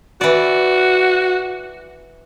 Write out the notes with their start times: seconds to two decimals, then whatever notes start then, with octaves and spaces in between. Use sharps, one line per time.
0.21 E3 F#4 D5